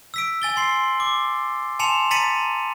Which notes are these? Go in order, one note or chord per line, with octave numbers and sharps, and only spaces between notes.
E6 B6 D7
G#5 A6 G7
G#5 C6 C7
D6
G#5 A5 C6 C#7 E7 F7
A#5 A6 B6 C#7 D#7 F#7